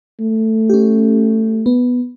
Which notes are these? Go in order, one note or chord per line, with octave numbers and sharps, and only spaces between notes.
A3
C#4 G4
B3